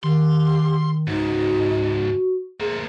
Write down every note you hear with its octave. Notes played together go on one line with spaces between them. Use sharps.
D#3 G4 C6
C#2 G#2 D#4 F#4
A3 A#3 C4 G#4